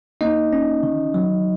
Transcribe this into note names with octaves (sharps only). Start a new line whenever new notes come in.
A#3 D#4 D#5
C#4
D#3
F#3